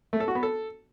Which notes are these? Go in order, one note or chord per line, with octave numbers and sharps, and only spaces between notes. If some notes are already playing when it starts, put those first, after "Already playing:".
A3
A4
F#4
B3
A4